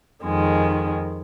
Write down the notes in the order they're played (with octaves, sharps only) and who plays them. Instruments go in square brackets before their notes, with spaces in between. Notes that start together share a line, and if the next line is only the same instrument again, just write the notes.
[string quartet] F2 D#3 G#3